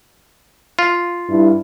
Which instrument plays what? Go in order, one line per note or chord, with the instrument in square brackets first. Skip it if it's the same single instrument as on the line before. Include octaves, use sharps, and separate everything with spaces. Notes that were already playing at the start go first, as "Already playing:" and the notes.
[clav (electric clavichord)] F4
[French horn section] G2 E4